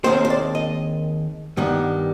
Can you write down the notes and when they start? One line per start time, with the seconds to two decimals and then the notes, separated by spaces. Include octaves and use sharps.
0.04 D#2 D#3 G#3 C4 C5
0.25 C5
0.30 D5
0.55 D#5
1.57 G2 D#3 G3 B3